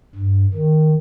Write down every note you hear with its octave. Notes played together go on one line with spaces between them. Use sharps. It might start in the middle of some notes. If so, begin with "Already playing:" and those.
G2
D#3